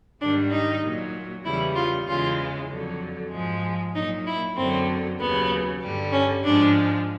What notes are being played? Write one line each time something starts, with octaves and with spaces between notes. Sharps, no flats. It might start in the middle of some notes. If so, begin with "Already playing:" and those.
G#2 D#3 G3 D4
D#4
A#2 F#3
E2 C#3 E3 G3 E4
F4
E2 C#3 E3 G#3 F4
F2 D3 F#3
G#2 F3 G#3
A#2 F#3 D#4
E4
F#2 D3 F#3 C4
D#2 C#3 F#3 B3
G2 D3 G3
C#4
G#2 F3 G#3 D4